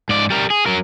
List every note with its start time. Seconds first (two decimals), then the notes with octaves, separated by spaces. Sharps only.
0.09 G#2 D5
0.30 G3 A#4
0.50 G#4
0.66 F#3 A#4